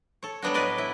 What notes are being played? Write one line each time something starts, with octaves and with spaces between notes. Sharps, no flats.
A4 C#5
F#3 G3 B3 D4 F#4
A2 B4 D5 D#5 G#5
E4